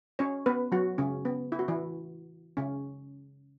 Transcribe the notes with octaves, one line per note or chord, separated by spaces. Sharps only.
C#4 C#5
B3 B4
F#3 F#4
C#3 C#4
B3
E4
F#4
E3 E4
C#3 C#4